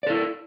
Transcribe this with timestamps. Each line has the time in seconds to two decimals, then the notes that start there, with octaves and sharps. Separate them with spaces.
0.03 D5
0.07 A4
0.10 E4